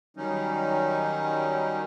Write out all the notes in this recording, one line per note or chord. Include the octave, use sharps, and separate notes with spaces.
D#3 F#3 G3 C#4 D#4